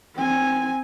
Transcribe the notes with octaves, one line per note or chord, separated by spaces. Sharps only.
C4 G#5